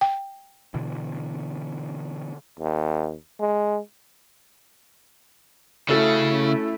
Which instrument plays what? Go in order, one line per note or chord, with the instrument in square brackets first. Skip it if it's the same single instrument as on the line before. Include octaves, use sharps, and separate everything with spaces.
[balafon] G5
[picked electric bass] B2 D3 E3
[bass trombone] D#2
G#3
[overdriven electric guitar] C#3 [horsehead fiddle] A3 E4 [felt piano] C#4 F#4 A4